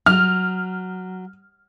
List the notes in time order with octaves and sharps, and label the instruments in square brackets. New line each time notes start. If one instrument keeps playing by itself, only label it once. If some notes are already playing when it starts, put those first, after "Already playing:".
[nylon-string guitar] F#3 [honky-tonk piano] F6